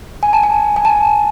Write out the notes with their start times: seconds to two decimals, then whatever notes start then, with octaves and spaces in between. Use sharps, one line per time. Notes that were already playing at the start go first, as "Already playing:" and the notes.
0.23 G#5
0.33 A5
0.43 G#5
0.76 G#5
0.85 A5